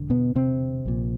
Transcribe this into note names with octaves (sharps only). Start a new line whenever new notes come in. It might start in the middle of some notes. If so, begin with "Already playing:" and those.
Already playing: E1 D3
B2 B3
C3 C4
A#1 A#2